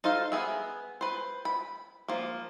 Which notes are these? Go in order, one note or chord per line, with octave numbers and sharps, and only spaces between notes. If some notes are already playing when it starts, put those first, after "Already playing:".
D#4 A4 C5 F5
B3 G#4 E5
B4 C5
B5
F3 A#3